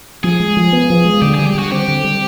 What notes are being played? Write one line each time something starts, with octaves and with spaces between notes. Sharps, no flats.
F3 G#4
G#3
F3
B3
F3
G#3
D3 G4
G3 G#4
G4
D3 F#4
C4 G4
D3
G3